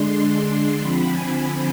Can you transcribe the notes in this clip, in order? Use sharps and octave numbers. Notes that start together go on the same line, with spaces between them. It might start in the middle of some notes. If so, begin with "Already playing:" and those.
Already playing: D3 G#3 D4 C6
D3 F3 C4 B5
G#5